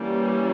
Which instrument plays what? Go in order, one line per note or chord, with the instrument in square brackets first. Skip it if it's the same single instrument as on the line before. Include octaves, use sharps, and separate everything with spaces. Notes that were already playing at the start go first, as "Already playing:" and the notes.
Already playing: [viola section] E3 G3 A#3 C#4